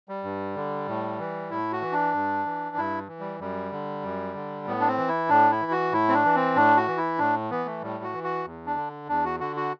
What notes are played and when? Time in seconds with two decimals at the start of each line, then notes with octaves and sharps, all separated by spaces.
0.09 G3
0.24 G2
0.55 D3
0.87 A2
1.19 E3
1.50 A2 E4
1.72 F#4
1.82 E3
1.92 D4
2.13 G2
2.45 E3
2.76 G2 E4
3.08 E3
3.20 G3
3.39 F#2 G3
3.72 D3
4.03 F#2
4.35 D3
4.67 A2 B3
4.80 D4
4.87 C4
4.98 E3
5.08 E4
5.29 A2 D4
5.51 E4
5.62 E3
5.71 F#4
5.92 A2 E4
6.09 C4
6.13 D4
6.25 E3
6.35 C4
6.56 A2 D4
6.77 F#4
6.88 E3
6.97 E4
7.19 A2 D4
7.50 E3 B3
7.66 A3
7.82 A2 G3
8.03 F#4
8.13 E3
8.24 F#4
8.45 E2
8.66 D4
8.76 D3
9.08 E2 D4
9.25 F#4
9.40 D3 F#4
9.56 F#4